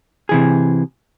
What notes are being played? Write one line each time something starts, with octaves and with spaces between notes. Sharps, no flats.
C3 E3 G#4